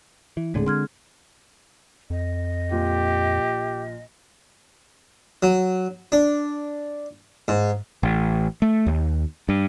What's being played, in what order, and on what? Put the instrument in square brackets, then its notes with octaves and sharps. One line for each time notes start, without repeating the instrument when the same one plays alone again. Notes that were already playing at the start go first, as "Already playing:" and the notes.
[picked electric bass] E3
[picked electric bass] D#1 A2 D3 [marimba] G#3 C4 G#4
[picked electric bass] D3 [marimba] C6 F6 G#6
[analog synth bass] F2 [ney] D#5
[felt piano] A#1 A#2 [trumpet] G4
[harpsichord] F#3
D4
G#2
[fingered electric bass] A1
A3
D#2
G2